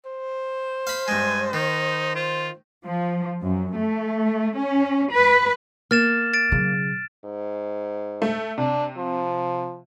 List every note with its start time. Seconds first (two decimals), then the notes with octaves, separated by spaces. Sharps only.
0.05 C5
0.87 F5 B5
1.08 G2 G#3 G#5
1.53 D#3 D#4
2.15 F4 C5
2.85 F3
3.43 F#2
3.76 A3
4.57 C#4
5.13 B4
5.91 A#3 F6 A6 E7
6.34 A6 D7
6.52 C#3 F#3
7.25 G#2
8.22 A3
8.58 C3 D4
8.97 F3